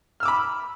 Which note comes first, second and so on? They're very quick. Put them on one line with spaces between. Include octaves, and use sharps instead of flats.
F6 E6 D6 B5